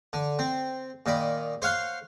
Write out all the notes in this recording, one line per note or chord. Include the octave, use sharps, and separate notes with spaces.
D3
C4
A#2 D#3 D5 B5
C5 C#5 F5 F#5 C6